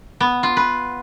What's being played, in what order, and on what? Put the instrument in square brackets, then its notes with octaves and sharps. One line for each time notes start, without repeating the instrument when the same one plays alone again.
[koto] B3
F4
B4